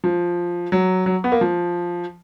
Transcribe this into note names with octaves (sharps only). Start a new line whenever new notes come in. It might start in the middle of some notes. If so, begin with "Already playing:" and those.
F3
F#3
F#3
B3
A#3
F3